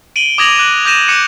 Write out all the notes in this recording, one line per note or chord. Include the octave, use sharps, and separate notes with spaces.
D7 D#7 F#7 G7
D6 D#6 G#6 A#6 F7 F#7
D6 F#6 F#7
D6 G6 A#6 D#7 E7
D6 F#6 G6 C#7 D#7